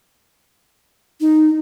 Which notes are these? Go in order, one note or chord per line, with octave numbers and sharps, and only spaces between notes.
D#4